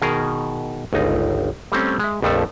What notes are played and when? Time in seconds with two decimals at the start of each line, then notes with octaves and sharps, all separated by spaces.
0.02 B2 D#3 G#4 A#4
0.93 G1 C#2 D#4
1.72 G3 A3 C4 C#4
1.99 G#3 E5
2.22 A#1 F2 F3 A3 A4